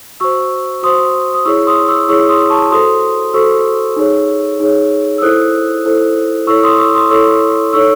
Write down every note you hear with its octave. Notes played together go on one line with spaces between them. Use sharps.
F#4 C5 C#6 E6
F#4 C5 C6 D#6
D#6
E4 G#4 C#5 C#6 E6
C6 D#6
C#6 E6
E4 G#4 C#5 C#6 E6
C6 D#6
A5 C#6
F#4 A4 C5 C6 D#6
F#4 A4 C5 C#6 E6
D#4 G#4 C#5
D#4 G#4 C#5
E6
E4 A4 C5 D#6 F#6
E4 A4 C5
E4 A4 C#5 C#6 E6
C6 D#6
C#6 E6
C6 D#6
E4 A4 C#5 C#6 E6
D#4 A4 C#5 C#6 E6